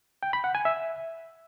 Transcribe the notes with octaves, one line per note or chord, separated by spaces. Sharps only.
G5
B5
F#5
G#5
E5